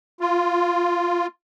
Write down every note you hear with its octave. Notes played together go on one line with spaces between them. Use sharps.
F4